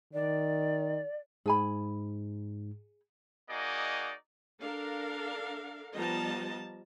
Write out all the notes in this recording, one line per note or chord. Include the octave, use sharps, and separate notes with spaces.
D#3 D5
G#2 G#4 G#5 B5
A#3 D#4 F#4 G#4 D5 D#5
D4 A4 A#4 F5
F3 G3 B3 D#5 A5 A#5